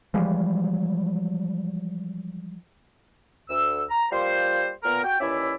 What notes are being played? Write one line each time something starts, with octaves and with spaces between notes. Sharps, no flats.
E3 F3 G3 G#3
D2 E6
A#5
G3 A#3 F4 C5
A#2 B3 A#4
F#4 G5
D#2 E3 C#4 E4 D5 E5